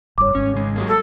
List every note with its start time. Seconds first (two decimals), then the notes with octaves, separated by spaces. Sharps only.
0.18 F#1 G2 C#5 D6
0.35 G#1 G#2 C#4
0.54 C#3 G#3
0.76 F#3 G#3 A#3
0.88 A4